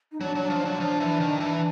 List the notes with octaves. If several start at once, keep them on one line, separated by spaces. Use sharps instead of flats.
D#4
F#3 D4
F#3
D4
F3
D#4
F#3 D4
F3
E3
D#3
E3